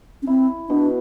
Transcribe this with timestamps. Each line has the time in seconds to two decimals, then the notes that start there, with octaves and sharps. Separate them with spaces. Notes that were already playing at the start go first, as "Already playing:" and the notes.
0.22 C#4
0.27 C4 E4
0.69 B2 D4